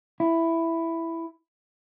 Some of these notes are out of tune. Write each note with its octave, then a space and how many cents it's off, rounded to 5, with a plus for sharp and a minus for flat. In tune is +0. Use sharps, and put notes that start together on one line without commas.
E4 +5